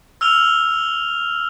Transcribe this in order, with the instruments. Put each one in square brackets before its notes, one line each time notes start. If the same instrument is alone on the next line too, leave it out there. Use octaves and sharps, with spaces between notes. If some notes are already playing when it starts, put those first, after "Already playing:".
[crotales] E6 F6 F7 G7